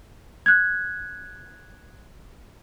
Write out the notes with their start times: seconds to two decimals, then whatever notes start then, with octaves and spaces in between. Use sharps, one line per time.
0.46 F#6 G#6